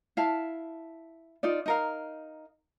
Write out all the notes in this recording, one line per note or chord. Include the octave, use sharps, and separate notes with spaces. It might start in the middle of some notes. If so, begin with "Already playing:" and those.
E4 F5 A5
D#4 F4 D5
D#4 A#4 F5